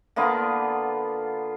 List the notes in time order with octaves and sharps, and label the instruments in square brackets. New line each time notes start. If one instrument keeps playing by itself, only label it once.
[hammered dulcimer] D3 A#3 B3 F4